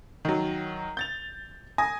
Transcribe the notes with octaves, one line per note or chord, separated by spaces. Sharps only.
D#3 F#3
G6 A6 F7
G#5 D#6 A#6